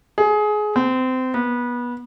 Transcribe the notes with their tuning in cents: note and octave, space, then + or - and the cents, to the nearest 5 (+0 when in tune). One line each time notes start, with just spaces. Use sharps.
G#4 +20
C4 -25
B3 -25